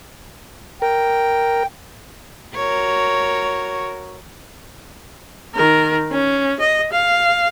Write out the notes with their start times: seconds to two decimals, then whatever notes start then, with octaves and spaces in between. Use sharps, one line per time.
0.82 A#4 G5
2.55 F#4 A#4 C#5
5.54 D#3 A#4
6.11 C#4
6.60 D#5
6.92 F5